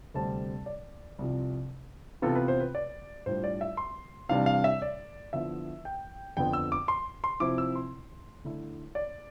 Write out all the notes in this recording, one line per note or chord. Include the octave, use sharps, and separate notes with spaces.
D2 C3 G3 C4 A5
D5
C2 C3 F3
C3 E3 B3 F4 A4
B4
C5
B4
D5
A2 G3 D4 F4 C5
D5
E5
C6
C3 E3 G3 D4 F5
F5
E5
D5
D3 F3 B3 E4 E5
G5
F2 D3 F3 B3 G5
E6
D6
C6
C6
C3 F3 C4 E4 D6
E6
C6
D3 A3 E4
D5